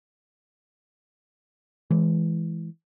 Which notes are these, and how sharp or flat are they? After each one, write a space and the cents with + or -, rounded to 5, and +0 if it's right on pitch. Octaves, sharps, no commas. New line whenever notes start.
E3 +0 G#3 +25